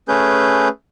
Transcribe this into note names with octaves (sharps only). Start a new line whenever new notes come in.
A3 C#4 G#4 B4 G6